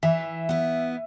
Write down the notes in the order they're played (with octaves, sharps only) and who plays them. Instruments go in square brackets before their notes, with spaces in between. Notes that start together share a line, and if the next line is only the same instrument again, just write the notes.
[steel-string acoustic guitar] E3 [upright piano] E5
[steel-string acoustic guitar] B3 E4